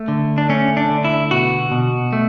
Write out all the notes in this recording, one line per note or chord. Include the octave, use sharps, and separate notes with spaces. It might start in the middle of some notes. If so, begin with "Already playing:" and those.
Already playing: A3
D3
D4
A3 C#4
D4
D3
E4
B2 F#4
B2
A3